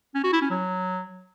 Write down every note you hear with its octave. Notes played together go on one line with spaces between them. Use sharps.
C#4
F#4
E4
C#4
F#3